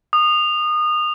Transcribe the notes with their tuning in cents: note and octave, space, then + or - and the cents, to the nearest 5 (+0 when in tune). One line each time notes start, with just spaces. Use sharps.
D#6 -25